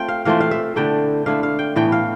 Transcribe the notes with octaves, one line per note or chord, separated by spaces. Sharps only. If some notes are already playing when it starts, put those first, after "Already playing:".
Already playing: A3 C4 F4 G5
F5
E3 A3 C4 F4 F5
F5
E5
D3 A3 E4 G5
D3 A3 E4 F5
F5
G5
A2 E3 B3 G5
F5